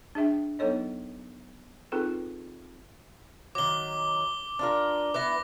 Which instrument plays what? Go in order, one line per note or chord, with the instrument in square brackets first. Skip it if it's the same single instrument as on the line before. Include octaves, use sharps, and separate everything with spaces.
[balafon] D4 G#4 E5 G5
F#3 B3 D#4 A4 C#5 D#5
C4 D#4 F4 G#4 A4 B4
[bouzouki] D#3 F#3 [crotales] D6 G7
[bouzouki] D4 F4 A#4
[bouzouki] B3 E4 B4 [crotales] D6 A#6